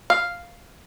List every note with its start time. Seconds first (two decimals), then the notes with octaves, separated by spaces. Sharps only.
0.10 F5